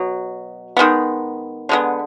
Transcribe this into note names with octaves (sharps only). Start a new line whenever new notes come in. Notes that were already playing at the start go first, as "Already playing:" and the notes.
Already playing: B2 F#3
D#3 G#3 B3
D3 G#3 B3